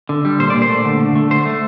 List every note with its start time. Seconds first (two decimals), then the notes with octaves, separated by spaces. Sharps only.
0.09 D3
0.25 G3
0.39 A#2 C5
0.50 A#2 D5
0.62 C5
0.70 A3
0.85 D3
1.00 D3
1.16 A3
1.30 A3 C5
1.45 A3